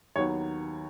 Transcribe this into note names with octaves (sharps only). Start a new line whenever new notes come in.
D#2 D#3 F#3 B3 C#5